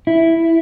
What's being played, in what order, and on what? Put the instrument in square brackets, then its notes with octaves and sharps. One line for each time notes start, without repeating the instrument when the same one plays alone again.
[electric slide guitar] E4